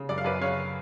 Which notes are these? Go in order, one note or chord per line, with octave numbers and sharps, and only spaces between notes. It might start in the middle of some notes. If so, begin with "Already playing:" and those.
Already playing: C#3
F#2 D5
F5
F#2 B4 D5
C#3 C#5 F5